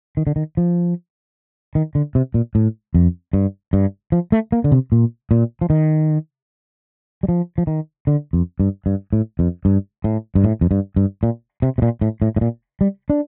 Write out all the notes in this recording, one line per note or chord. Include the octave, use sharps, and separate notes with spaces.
D#3
D3
D#3
F3
D#3
D3
C3
A#2
A2
F2
G2
G2
F3
A3
A#3
D3
C3
A#2
A#2
F3
D#3
G3
F3
F3
D#3
D3
F2
G2
G2
A2
F2
G2
A2
G2
A2
F2
G2
G2
A#2
C3
C3
A#2
A2
A2
A2
A#2
G3
D4